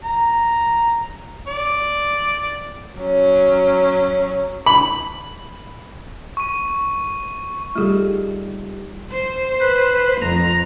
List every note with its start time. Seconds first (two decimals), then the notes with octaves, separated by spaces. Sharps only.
0.04 A#5
1.48 D5
2.97 F#3 C#4
4.66 B5
6.37 C#6 D#7
7.76 G3 A3 D#4 F4 G#4 A4
9.11 C5
9.60 B4
10.21 F2 A#5